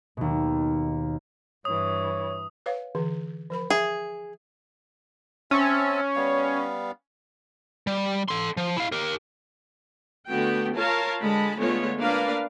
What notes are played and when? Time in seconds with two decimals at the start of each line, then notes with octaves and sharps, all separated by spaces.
0.17 D#2 B2
1.65 G2 E3 C#5 D#6
2.66 B4 C#5 F5
2.95 D3 E3
3.50 F3 A#4 B5
3.70 G#4 E5
5.51 C4 C#4 E5 A5
6.16 G3 B3 F5
7.87 G3
8.28 A4 C6
8.57 F3
8.77 E4 F5
8.92 G4 A#4
10.28 D3 A3 B3 F#4 G5
10.75 F4 A#4 C#5 F5 A5
11.21 D3 G#3 A5 B5
11.58 D3 G#3 A3 B3 F4 C#5
11.99 A#3 D4 A#4 B4 D5 F5